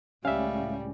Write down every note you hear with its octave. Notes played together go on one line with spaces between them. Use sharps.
C#2 A2 G3 C#4 E5 F5